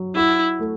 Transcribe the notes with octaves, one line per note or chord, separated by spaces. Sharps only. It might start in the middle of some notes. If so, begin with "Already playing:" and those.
Already playing: F#3
E4 F#4
A3